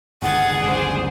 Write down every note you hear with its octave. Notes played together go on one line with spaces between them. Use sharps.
G1 C#2 D#3 G#4 F#5 G#6 A6
D1 G1 C#2 D4 C5